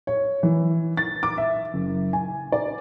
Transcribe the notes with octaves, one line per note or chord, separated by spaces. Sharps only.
C#5
E3
A6
D6
E5
F#1
G#5
D5